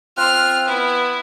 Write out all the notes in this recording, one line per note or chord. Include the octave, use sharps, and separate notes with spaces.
C4 F4 C6 F6 F#6
B3 E4